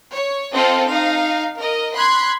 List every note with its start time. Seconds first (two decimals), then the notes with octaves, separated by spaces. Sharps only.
0.12 C#5
0.52 C4 F4 A4 D#5 F5
0.87 D#4 F5
1.58 A#4 D#5
1.95 B5 C6 F#6 G#6